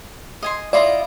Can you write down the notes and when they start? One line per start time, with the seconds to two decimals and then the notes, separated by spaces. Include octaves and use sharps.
0.42 D#5 G#5 C6
0.73 E4 F4 D5 D#5